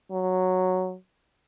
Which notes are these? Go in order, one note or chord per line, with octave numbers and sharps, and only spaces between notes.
F#3